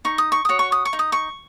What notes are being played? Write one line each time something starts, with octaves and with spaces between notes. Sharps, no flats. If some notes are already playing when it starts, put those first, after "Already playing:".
D#4 C#6
D#6
C#6
F#4 C#5 D#6
C#6
D#6
C#6
D#4
D#6
C#6